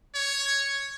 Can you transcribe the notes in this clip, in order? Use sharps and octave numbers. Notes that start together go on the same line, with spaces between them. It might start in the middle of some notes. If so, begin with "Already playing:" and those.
C#5